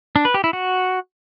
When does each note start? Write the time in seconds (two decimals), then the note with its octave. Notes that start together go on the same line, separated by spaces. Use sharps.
0.16 D4
0.25 B4
0.34 G4
0.44 E4
0.53 F#4